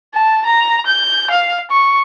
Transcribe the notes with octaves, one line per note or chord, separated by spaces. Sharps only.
A5
A#5
G6
F5
C#6